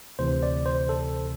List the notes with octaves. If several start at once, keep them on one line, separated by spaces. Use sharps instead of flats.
D2 C3 E3 C5
D5
C5
A4